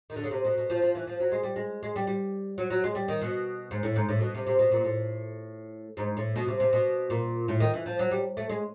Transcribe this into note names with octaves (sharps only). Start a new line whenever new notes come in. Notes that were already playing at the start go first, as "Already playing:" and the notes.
D#3
D3
C#3
C3
B2
B2
F3
F3
E3
F3
F#3
G#3
G3
G#3
G#3
G3
G3
F#3
F#3
G#3
G3
D#3
B2
G#2
A2
G#2
A2
B2
C3
C3
B2
A#2
A2
G#2
A2
B2
C3
C3
B2
A#2
A2
D#3
E3
F3
F#3
G3
A3
G#3